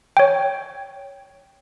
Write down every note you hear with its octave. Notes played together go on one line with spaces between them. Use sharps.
C#5 G5